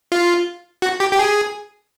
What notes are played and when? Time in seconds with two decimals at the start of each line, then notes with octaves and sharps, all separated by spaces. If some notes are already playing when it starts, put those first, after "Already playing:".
0.12 F4
0.82 F#4
1.00 G4
1.12 G4
1.19 G#4